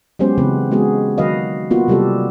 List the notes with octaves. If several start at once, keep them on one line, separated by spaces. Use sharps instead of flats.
F#3 G#3 B3 C#4 G4 C5
C#3 E3 B3 C4 B4
G#3 B3 F#4 G#4
D#3 F#3 F#4 B4 D#5 F5
A#3 B3 F4 F#4
C3 F#3 G3 B3 G4 A4